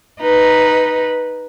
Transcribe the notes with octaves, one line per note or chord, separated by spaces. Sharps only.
D#4 B4